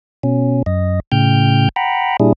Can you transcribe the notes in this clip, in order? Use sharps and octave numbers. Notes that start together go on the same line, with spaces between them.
B2 C#4
F#2 D#5
A2 C#3 G5 F6 G6
F#5 G5 A#5 B5
A#2 G3 D4 E4 G#4